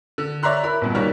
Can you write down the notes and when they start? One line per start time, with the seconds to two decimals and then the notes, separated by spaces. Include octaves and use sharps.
0.18 D3
0.43 C#5 D5 E5 A#5 C6 F#6
0.63 E4 A#4 B5
0.81 G1 G2 B2
0.95 B1 D#3 G3 A#3 C#5 F6